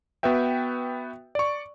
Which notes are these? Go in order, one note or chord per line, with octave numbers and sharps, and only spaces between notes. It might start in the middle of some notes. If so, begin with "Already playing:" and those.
B3 F#4 B4 E5 G5
D5 C#6